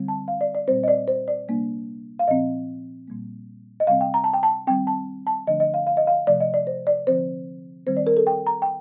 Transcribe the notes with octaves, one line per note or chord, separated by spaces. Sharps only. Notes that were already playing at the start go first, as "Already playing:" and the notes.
Already playing: D3 G3 C4
A5
F5
D5
D5
A#2 G3 C4 C5
D#5
D5
C5
D5
C3 G3 A#3 D4
F5
A#2 F3 C4 D#5
A#2 G3 A#3
D#5
C3 G3 C4 F5
G5
A#5
A5
G5
A5
D#3 G3 C4 G5
A5
A5
D3 F3 A3 D4 D#5
D#5
F5
F5
D#5
F5
C3 F3 A3 D5
D#5
D5
C5
D5
D3 F3 C4 C5
D#3 G3 C4 C5
D5
A#4
A4
G5
A#5
G5